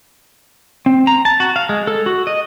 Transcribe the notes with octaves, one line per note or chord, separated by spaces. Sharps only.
C4
A#5
A5
F#4
F5
G#3
A4
F#4
D#5